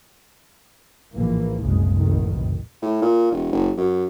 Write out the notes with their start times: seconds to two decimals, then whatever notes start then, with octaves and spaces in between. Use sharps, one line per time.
1.15 A#1 A2 E3 A#3
1.62 F#1 C2 A2 C#3 G#3
1.95 F1 B1 A2 D#3
2.82 A2
3.02 A#2
3.32 E1
3.52 F#1
3.78 F#2